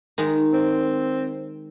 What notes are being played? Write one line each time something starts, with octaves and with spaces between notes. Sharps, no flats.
D#3 G#3 D#4
C4